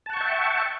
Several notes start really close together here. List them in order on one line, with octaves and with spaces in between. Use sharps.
A5 F#5 C#6 G5 E5